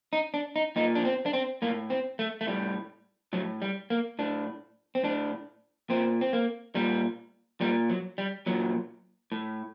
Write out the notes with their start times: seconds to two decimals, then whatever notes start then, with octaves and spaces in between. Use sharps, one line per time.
0.13 D#4
0.34 D4
0.56 D#4
0.76 A#2 D#4
0.95 D4
1.05 C4
1.26 D4
1.33 C4
1.62 A2 A#3
1.90 C4
2.19 A3
2.41 A3
2.47 A2 G3
3.33 A2 F#3
3.62 G3
3.90 A#3
4.19 A2 D4
4.95 C4
5.04 A2 D4
5.90 A#2 C4
6.21 C4
6.33 A#3
6.75 A#2 G3
7.61 A#2 G3
7.90 F#3
8.18 G3
8.46 A#2 F#3
9.32 A2